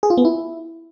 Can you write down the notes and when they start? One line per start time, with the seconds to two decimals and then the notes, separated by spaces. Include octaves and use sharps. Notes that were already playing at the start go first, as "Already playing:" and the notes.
0.03 G#4
0.10 F4
0.17 B3
0.25 E4